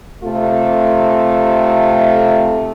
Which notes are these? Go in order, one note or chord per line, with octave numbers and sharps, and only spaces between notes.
C3 A3 F4 A4